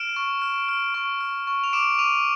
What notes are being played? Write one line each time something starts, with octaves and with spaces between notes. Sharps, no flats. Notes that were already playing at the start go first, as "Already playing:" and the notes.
Already playing: F6 D7 E7
C#6
F6
F6
C#6
F6
C#6
F7
D6 D7 E7
D6 D#7 F7